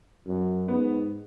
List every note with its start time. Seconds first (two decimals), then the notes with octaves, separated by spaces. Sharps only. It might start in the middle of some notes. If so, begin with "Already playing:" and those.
0.27 F#2
0.68 G#2 B3